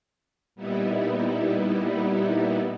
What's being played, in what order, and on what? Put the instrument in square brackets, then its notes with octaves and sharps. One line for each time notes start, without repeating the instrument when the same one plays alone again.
[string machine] A#2 G3 B3 D#4 E4